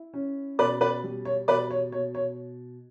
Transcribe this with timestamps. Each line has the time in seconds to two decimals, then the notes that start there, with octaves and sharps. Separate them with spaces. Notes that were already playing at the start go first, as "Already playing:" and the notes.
Already playing: E4
0.14 C#4
0.58 B2 B4 D5
0.81 B4 D5
1.03 G3
1.25 C#5
1.48 B2 B4 D5
1.71 C#5
1.92 B2 C#5
2.15 C#5